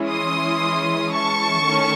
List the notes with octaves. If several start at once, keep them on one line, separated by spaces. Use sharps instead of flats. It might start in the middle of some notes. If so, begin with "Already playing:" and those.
Already playing: E3 G#3 C#4 E4
C6 D#6
A5 C#6
D#3 A3 C#4